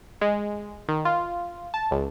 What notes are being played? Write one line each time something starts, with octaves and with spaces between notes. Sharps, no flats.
G#3
D#3
F4
A5
C#2